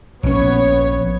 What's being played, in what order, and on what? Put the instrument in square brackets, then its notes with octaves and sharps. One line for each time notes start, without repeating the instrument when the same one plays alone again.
[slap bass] A#1 C#4 [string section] B3 C#5